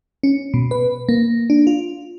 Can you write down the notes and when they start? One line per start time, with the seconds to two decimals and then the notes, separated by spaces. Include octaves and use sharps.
0.23 C#4
0.54 B2
0.71 B4
1.09 A#3
1.50 D4
1.67 F4